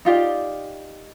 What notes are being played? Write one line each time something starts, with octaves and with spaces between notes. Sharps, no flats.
D#4 F4 G4 D5